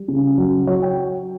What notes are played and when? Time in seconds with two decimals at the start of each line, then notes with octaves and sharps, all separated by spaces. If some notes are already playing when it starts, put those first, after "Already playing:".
Already playing: G3
0.08 C#3
0.38 F#3
0.67 F#3 C#5
0.82 G5